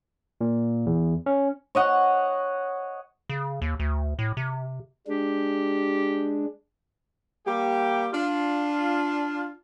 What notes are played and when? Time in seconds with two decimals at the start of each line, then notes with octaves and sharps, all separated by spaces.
0.41 A#2
0.86 E2
1.26 C#4
1.75 C#5 D#5 F#5
3.29 C#3
3.62 D#2
3.79 D2
4.19 A2
4.37 C3
5.07 G#3 D4 G4
7.47 G3 A#3 G4
8.13 D4 F4